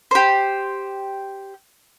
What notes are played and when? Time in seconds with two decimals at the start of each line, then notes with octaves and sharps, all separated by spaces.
0.11 G4 C5